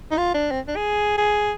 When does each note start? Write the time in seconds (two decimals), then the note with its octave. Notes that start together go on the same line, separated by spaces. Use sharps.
0.11 D#4
0.18 F4
0.34 D4
0.51 C4
0.68 D4
0.76 G#4
1.18 G#4